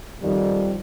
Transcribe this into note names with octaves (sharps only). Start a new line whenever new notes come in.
F2 D#3 F3 G3